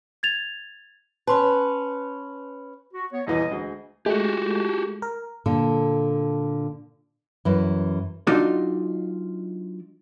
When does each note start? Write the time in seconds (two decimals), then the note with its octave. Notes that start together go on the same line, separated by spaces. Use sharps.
0.23 G#6 A6 F7
1.27 C#4 B4 A5 C6
2.93 F#4
3.12 B3 C#5
3.27 D#1 E2 E3 D#5
3.50 D2 G#3
4.06 G#3 A3 F#4 G4
5.02 A#4
5.46 A#2 D3 A4
7.45 F#2 E3
8.27 F#3 D4 D#4 F4 D5 D#5